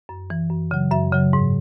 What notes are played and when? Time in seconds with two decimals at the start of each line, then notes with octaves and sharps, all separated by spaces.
0.09 F#2
0.30 E3
0.50 F#2
0.71 C#3 F#3
0.91 F#2 E5
1.13 C#3 F#3
1.33 G#2